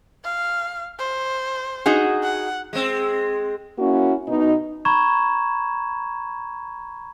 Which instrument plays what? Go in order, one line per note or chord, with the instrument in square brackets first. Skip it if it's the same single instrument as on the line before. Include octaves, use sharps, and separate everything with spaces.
[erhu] F5
C5
[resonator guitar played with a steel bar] D#4 F#4 G#4
[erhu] F#5
[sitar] G#3 C4
[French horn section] A#3 C#4 E4 F#4
B2 D#4
[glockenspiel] A#5 B5 C#6 G#6 E7